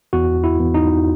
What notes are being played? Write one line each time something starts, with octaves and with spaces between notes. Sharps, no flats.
E2 F#4
E4
E2
D#4